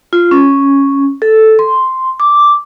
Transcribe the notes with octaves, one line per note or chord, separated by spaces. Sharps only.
F4
C#4
A4
C6
D6